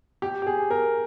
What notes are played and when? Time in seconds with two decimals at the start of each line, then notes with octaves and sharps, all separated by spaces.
0.22 G4
0.42 G4
0.47 G#4
0.70 A#4